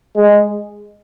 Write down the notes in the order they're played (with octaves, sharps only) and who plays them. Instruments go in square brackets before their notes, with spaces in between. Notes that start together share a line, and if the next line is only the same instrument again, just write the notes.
[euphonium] G#3